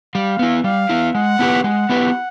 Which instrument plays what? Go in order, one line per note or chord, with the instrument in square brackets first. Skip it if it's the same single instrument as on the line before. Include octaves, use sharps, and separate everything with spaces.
[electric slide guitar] G3 [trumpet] F5
[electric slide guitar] B3 E4
[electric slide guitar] G3 [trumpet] F5
[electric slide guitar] B3 E4
[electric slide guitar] G#3 [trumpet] F#5
[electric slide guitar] B3 E4 G4 B4
[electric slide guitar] G#3 [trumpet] F#5
[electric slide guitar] B3 E4 G4 B4